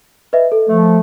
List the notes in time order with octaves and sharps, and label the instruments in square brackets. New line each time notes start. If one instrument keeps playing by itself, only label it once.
[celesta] B4 D#5 E5
A4
[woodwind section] F3 A3